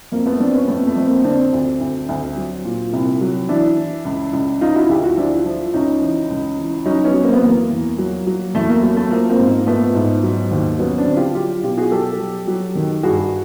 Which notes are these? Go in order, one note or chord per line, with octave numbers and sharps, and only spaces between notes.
F2 A#3
A3 B3
F2 C4 D4
B3 C#4
F2 A3 B3
A3
F2
A#3 C4
D3 C4 D4
D2
D2
D2
F#3
A#2
C2
F#3
E3 D4 E4
E3
C#2
C#2
F3 D#4 F4
E4 F#4
D2 F4 G4
E4 F#4
F3 D4 E4
F3
C#2 C#4 D#4
E3
C#2
E3
F#3 C#4 D#4
B3 C#4
F#3
A#3 C4
B3
E2 A#3
E2
F#3
F#3
E2 A3
A#3
F#3 A3
A3
F3 A#3
A#3 C4
G#2
A#3
F3 A3 B3
G#2
F#3
D#2
F#3 B3 C#4
C4 D4
D3
F4 G4
F#3 F4 G4
B2 F4 G4
F#4 G#4
F#3 G4 A4
F#3
F#3
D#3
G2 F#4 G#4